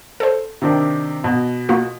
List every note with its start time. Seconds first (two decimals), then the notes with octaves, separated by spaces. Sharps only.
0.20 A4 C5
0.62 C3 D#3 D4
1.24 B2
1.69 A#3 F4 F#4